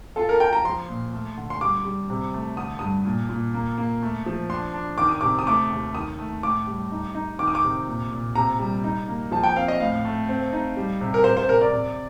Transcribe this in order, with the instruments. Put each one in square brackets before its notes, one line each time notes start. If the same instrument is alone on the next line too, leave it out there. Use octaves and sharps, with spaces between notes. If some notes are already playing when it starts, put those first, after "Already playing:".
[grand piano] F4 [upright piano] A4
[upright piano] A#4
[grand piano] F4 [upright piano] G5
[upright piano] A#5
[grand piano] F3 [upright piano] C6
[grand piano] A#2
A3
D3
[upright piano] C6
[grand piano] G3 [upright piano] D6
[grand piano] G3
C3
A3
[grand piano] D3 [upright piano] D#6
[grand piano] G2 [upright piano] D#6
[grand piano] A#2
A#2
A#3
A#3
A3
F3
[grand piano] D4 [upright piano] C6
[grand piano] D4
[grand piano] D#3 [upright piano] D6
[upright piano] D#6
[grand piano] C3 [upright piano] D6
[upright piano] D#6
[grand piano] A3 [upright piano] D6
[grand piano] D#2
[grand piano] D#3 [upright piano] D#6
[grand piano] A3
[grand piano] A2 [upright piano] D6
[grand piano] G3
D#4
D#4
[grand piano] D#3 [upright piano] D6
[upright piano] D#6
D6
[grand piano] C3
A#2
A#2
[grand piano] C3 [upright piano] A#5
[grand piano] G3
D#4
A#3
[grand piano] F3 [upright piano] A5
[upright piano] G5
[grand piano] C4 [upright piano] F5
[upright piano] D#5
[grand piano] A2 [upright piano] F5
[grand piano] A3
C4
D#4
G3
C3
[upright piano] A#4
[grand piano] C3 [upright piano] C5
[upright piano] C5
[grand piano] C3 [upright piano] A#4
[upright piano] D5
[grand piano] C3